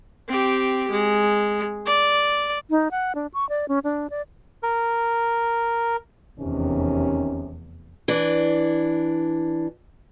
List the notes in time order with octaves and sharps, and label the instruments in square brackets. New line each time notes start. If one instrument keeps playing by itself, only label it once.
[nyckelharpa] C4 G4
G#3
D5
[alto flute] D#4
F#5
D4
C#6
D5
C#4
D4
D5
[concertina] A#4
[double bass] F1 E2 [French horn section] C3 D#3 C#4
[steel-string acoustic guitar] E3 D4